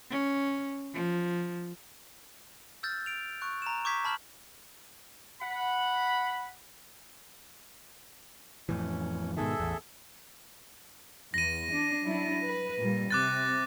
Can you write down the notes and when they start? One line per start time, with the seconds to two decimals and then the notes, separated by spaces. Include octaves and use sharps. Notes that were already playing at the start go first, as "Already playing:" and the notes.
0.11 C#4
0.94 F3
2.83 E6 F6 G6 A6
3.06 D7 F7
3.41 C#6 F#6
3.62 A#5 E7
3.85 C#6 D6 E6 G6 G#6 B6
4.05 A5 B5 F6 G6 F#7
5.41 F#5 B5
8.69 F2 A2 E3 C#4
9.37 G#2 B2 D#3 G#4 A4 E5
9.60 A1 E2
11.34 E2 A#6 D#7
11.73 D4
12.06 F#3 D4 E4
12.44 B4
12.81 A#2 G3
13.11 C3 D6 F#6 A6